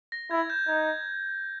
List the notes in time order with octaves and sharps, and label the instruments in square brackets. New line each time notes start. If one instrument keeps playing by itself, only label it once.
[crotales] A#6
[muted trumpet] E4 [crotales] G#6
[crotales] G6
[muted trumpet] D#4 [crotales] G#6